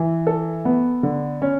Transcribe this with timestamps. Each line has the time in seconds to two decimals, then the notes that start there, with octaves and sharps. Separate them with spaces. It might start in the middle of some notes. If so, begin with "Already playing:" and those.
Already playing: E3
0.27 A4
0.65 B3
1.03 D3
1.42 C#4